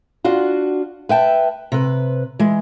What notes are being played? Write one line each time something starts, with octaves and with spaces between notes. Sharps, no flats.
D4 F4 F#4
B4 E5 G5 A5
C3 B4
E3 G#3